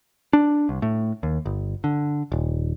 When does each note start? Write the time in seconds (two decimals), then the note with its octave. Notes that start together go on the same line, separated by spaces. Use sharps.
0.33 D4
0.69 C2
0.82 A2
1.23 D#2
1.46 G1
1.84 D3
2.32 D#1